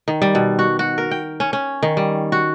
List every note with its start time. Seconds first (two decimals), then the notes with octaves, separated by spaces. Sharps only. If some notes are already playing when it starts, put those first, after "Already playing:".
0.08 D#3
0.22 G3
0.35 B2
0.59 F#4
0.79 F#4
0.98 A#4
1.11 G5
1.40 C#4
1.53 C#4
1.83 D#3
1.97 G3
2.32 F#4